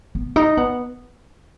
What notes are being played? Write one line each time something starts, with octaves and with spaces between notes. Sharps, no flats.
B3
D#4
B3